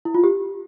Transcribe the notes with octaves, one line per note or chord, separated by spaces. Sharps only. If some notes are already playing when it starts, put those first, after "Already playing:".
E4
F4
G4